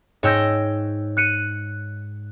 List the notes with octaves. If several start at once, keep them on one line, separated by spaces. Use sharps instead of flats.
G#2 C#5 G5 E6 G6 A#6
F#6 C#7 D#7